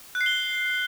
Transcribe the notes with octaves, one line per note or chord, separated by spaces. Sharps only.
F#6
C7
G7